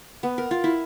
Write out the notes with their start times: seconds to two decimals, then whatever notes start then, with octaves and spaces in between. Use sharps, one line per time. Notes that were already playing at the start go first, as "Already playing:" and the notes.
0.23 B3
0.38 A#4
0.51 F4
0.64 E4